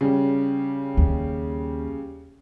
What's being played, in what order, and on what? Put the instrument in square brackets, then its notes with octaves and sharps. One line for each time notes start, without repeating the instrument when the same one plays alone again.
[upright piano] C#3 G3
[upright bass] D#2